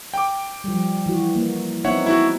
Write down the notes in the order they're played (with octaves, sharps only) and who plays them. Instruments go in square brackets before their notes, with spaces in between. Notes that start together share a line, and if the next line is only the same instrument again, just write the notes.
[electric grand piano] G5 D6
[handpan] F3 G3
E3 F#4
A#3
[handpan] B3 C4 D#4 [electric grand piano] C#5 E5 F#5
[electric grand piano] E4 F#4